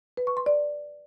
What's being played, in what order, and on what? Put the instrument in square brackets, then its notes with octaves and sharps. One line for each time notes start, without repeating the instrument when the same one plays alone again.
[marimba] B4
C#6
C6
D5